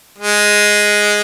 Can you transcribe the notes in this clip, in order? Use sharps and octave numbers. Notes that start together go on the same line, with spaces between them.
G#3